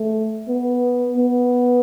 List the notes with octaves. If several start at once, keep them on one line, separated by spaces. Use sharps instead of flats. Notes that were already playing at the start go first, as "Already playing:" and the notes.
Already playing: A3
B3
B3